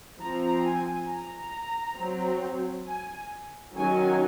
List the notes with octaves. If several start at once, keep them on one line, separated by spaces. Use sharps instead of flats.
F3 C4 A#5
G#5
A#5
F#3 C4
G#5
D#3 F#3 C#4 G#5